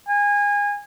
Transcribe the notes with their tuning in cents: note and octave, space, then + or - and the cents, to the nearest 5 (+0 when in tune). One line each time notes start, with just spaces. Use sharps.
G#5 -25